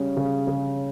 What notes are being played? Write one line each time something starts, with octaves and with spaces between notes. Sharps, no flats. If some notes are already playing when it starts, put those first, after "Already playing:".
Already playing: C#3 G3 C#4
C#3
C#3